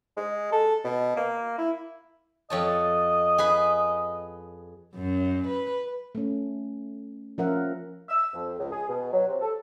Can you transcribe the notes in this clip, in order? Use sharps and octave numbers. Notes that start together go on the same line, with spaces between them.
G#3
A4
B2
A#3
E4
F2 C#5 D#5 A5
G#4 B4 B5
F#2
B4
A3 C#4
F3 C#4 F4 A#4 E5 F#5
E6
F2
C#2
G#4
B2
F#3
C3
A4